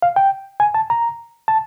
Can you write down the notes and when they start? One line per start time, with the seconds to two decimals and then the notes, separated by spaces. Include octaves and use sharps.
0.02 F5
0.16 G5
0.60 G#5
0.75 A5
0.90 A#5
1.48 A5